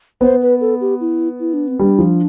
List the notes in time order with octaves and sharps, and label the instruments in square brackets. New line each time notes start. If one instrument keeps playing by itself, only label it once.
[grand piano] B3 [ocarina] C5
[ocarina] B4
A4
G4
E4
E4
D4
C4
[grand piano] G3 [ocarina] D4
[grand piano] F3